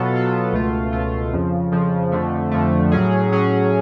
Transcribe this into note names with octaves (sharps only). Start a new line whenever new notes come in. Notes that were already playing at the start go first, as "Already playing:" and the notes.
Already playing: B2 F#3 B3 F4 A4
B2 F#3 B3 F4 A4
C#2 B2 A3 F4
C#2 B2 A3 F4
F2 C#3 F3
F2 C#3 F3
F2 D3 F3 A3
F2 D3 F3 A3
A2 F#3 C#4 G#4
A2 F#3 C#4 G#4